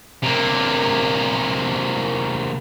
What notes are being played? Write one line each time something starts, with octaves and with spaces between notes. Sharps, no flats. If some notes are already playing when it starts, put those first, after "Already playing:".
C3 A#3